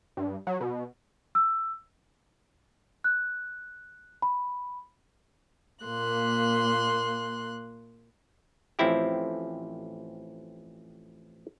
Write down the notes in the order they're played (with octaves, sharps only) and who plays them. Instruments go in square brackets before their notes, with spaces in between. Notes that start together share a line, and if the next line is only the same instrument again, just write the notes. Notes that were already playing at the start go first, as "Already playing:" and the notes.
[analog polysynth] G2
F#3
B2
[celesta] E6
F#6
B5
[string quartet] A#2 A#3 C6 F#6
[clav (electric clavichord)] A1 F3 C4 E4 G4